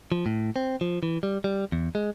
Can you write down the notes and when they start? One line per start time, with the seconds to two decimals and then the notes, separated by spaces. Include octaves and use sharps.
0.12 F3
0.26 A2
0.56 C4
0.81 F3
1.03 E3
1.23 G3
1.44 G3
1.72 E2
1.95 G#3